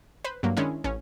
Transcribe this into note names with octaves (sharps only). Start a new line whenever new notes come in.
B4 C5
G2 F#3 A#3
D#3 G#3 C#4 D4 E4
A1 C#4